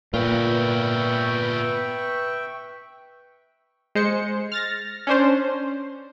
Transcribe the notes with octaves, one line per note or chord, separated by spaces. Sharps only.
A#2 B3 F4 B4 E5 G5 C#6
G#3 C5 C#7
F6 A6 A#6
C#4 D4 C5